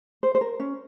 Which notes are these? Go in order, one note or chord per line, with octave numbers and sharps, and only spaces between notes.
C5
C5
A#4
C#4